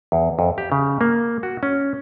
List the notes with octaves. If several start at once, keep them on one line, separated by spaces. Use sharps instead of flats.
E2
F2
G4
C#3
A#3
F#4
C#4